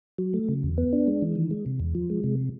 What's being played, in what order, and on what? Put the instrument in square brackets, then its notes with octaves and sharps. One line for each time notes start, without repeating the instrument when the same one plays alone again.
[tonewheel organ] F#3
A3
C#3
E2
B3
D4
G#3
E3
D#3
G#3
C3
E2
F3
G#3
C3